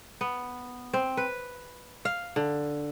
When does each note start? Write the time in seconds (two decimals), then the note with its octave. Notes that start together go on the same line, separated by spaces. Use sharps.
0.21 B3
0.93 C4
1.17 B4
2.05 F5
2.36 D3